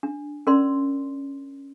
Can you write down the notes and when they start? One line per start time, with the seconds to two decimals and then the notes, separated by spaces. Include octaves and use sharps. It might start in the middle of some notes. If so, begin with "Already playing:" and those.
0.03 D4
0.47 C#4 A#4 D5 C6